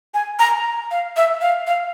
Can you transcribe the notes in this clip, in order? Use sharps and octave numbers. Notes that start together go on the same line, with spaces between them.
G#5
A#5
F5
E5
F5
F5